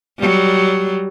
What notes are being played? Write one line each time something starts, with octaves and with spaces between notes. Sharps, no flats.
F#3 G3